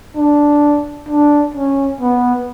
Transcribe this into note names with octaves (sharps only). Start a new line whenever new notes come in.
D4
D4
C#4
B3